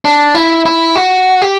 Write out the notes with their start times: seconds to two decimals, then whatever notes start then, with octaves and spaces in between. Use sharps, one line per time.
0.05 D4
0.35 E4
0.66 E4
0.96 F#4
1.42 G4